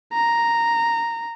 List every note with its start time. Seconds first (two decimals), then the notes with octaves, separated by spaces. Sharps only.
0.13 A#5